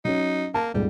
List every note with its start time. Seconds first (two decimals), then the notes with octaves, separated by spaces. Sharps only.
0.05 F#3 C#4 D#4
0.54 A#3 A5
0.74 D#1 G#2 G3